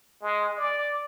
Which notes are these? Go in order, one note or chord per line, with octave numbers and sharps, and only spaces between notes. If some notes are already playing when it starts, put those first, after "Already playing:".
G#3
D5